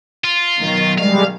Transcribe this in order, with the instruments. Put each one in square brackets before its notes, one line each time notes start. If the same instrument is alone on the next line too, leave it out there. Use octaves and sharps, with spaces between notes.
[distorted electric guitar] F4
[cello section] B2 D#3 F#3
[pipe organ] G3 G#3 [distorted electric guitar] F5